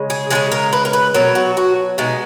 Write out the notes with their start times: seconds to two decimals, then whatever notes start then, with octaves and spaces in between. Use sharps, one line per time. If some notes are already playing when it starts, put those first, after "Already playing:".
Already playing: C#3 G#3
0.10 G#4
0.30 F3 G#3 G#4
0.35 C#3
0.52 A#4
0.73 B4
0.85 A#4
0.93 B4
1.14 B2 F#3 A#4
1.35 F#4
1.57 F#4
1.98 B2 G#3 D#4